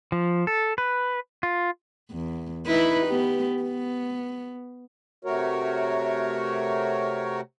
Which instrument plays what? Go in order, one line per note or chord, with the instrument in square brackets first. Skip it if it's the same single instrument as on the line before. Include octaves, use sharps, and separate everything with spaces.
[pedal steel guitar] F3
A4
B4
F4
[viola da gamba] E2
D#4 E4 B4
B3 G4
B3
[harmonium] C3 A3 F#4 A#4 C#5